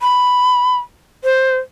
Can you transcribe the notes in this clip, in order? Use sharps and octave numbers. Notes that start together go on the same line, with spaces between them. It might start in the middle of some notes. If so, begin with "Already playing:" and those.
B5
C5